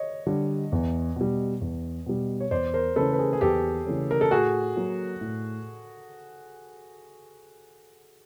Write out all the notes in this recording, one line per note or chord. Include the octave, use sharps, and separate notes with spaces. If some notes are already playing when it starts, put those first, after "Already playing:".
Already playing: C#5 D#5
D3 G3
E2
B2 G3
E2
B2 G3
C#5
E2 C5 D5
A#4 C5
C#3 E3 A3 C#4 A4 B4
B4
G#4 A#4
G#4
E2 G4 A4
C#3 E3 A3 C#4
A#4
A4
A2 F#4 G#4
F#3 A#3
A2